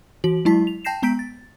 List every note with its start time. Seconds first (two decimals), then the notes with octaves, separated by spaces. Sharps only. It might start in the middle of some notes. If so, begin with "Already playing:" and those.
0.24 E3 F#4 F#7
0.45 F#3 G#3 E4 A5 B6
0.67 F7
0.85 G5 A5 G6 A#6 C7 E7
1.02 G#3 B3 A#5 G6 B6 D7
1.19 A6